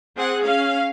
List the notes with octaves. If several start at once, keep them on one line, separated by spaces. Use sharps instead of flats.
C4 G#4 F#5
C#4 F5